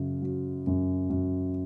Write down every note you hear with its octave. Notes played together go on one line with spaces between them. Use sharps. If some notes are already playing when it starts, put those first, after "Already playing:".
Already playing: F#2 C#3
F#3
F#2
F#2